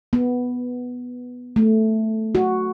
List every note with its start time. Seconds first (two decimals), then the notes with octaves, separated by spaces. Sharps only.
0.13 B3
1.56 A3
2.35 F#4